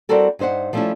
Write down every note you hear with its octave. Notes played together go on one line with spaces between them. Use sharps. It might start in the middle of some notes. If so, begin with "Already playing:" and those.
G3 C4 E4 F#4 A4 A#4
G2 D#4 C5 E5 F#5
F3 G3 A3 C4 C#4 E4